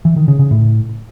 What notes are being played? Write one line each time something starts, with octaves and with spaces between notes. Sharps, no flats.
E3
D#3
C#3
C#3
A2